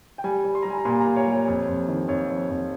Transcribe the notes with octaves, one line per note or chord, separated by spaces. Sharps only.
G5
G3 G#5
G3
C6
G3 A#5
G#5
A#5
A#2 C6
A#5
F4
C#5
G3
C#5
F2
F2
D#3
F2 C#5
F2
F2